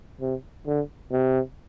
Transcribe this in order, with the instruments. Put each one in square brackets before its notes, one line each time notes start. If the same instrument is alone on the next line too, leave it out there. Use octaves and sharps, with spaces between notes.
[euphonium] C3
D3
C3